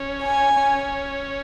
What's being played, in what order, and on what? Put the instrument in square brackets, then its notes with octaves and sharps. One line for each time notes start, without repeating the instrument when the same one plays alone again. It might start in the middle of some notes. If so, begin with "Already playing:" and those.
Already playing: [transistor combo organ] C#4
[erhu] G#5
[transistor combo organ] C#4